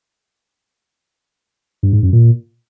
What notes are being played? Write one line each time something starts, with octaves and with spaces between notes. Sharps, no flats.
G2
G#2
F#2
A#2